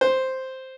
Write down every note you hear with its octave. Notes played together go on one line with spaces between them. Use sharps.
C5